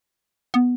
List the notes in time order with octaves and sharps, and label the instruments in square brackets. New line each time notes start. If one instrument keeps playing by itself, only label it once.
[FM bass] B3